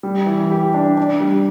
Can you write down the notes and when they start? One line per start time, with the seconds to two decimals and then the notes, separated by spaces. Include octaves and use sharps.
0.03 G3
0.26 E3
0.51 G4
0.74 D4
0.97 D4
1.20 G3